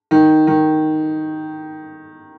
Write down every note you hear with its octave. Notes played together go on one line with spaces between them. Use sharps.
D#3
D#3